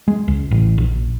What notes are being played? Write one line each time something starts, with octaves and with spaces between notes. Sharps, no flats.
G#3
C#2
A1
A#1